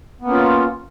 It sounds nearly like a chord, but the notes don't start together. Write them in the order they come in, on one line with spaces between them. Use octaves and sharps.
B3 A#3 C#4 F4